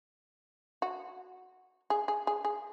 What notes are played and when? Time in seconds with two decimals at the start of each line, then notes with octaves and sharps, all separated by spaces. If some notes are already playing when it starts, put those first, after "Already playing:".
0.82 F#4
1.90 G#4
2.08 G#4
2.27 G#4
2.45 G#4